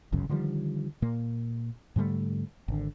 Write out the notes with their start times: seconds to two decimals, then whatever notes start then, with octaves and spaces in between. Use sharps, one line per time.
0.12 G1 C#2 F#2 C#3
0.29 D3 D#3 F3 G3
1.02 A#2 A#3
1.96 G#2 D3 G3 A3
2.68 G#1 D3